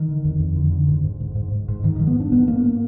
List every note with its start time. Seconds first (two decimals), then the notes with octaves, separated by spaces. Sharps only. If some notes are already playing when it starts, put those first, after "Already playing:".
Already playing: D#3
0.09 D3
0.25 F2
0.40 F2
0.56 D3
0.71 D3
0.88 G#2
1.04 G#2
1.20 G#2
1.35 G#2
1.52 G#2
1.68 G#2
1.84 G#2 D#3
1.96 G#2 F3
2.07 B3
2.16 G#2 D4
2.32 G#2 B3
2.48 G#2 A#3
2.64 A#3